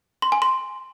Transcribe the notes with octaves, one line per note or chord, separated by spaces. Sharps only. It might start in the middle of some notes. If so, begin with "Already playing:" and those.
C6
G#5
C6